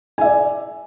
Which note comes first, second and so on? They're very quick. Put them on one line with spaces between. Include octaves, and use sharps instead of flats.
G#5 E5 D5